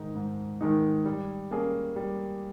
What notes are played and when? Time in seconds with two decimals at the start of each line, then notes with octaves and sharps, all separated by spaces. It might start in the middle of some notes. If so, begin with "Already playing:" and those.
Already playing: G#2 D#3 G#3 D#4
0.15 G#2
0.61 D#3 G#3 D#4
1.05 G3
1.51 A#3 C#4 G#4
1.96 G3